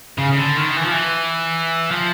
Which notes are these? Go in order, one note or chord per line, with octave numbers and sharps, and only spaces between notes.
C#3
C#3
D3
D#3
E3
F3
E3
F3